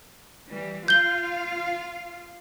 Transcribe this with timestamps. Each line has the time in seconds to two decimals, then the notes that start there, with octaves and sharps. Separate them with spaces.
0.48 E3 G3
0.88 F4 F5 G6 G7